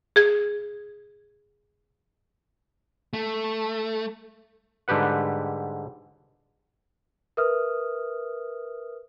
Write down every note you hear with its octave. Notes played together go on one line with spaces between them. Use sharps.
G#4 G#6
A3
G#2 D3 G3 G4 B4 F#5
A#4 B4 E5 D#6 F6